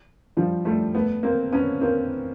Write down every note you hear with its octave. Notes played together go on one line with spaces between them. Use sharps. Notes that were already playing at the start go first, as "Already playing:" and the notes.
F3 G3
G3 A3
A3 B3
A#3 C4
B3 C#4
A#3 C4